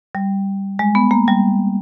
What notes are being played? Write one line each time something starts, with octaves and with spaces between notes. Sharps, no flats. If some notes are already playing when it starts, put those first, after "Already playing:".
G3
G#3
B3
A#3
G3